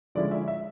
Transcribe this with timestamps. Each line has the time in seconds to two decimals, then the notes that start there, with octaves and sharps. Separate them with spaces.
0.15 D3 F3 G#3 C#4 E4 D5
0.31 E5
0.48 E5